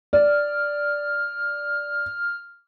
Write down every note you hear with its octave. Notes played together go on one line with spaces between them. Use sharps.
D5 F6